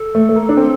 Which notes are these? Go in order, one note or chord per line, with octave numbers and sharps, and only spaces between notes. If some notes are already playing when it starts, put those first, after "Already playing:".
Already playing: A4
A3
A3
A#3
D4
C4